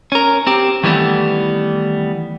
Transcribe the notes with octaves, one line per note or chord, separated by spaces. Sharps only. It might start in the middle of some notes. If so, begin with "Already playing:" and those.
C#4 A#4
C4 G4
D#3 E3 G3 A3 B3